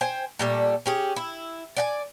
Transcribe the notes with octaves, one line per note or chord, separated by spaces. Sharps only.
C5 G5 G#5
A#2 G3 A3
C#4 G4 G#4
E4
D5 F#5 G#5